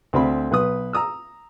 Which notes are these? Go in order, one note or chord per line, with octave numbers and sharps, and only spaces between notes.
D2 C4 B5
B1 B4 D#6
A#5 D#6 E6